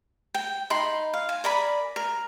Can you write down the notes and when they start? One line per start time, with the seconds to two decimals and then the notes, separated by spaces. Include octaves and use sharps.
0.34 G5
0.70 D#4 B5 C6
1.14 F5
1.29 G#5
1.44 A#4 D5 G#5 B5
1.96 A#4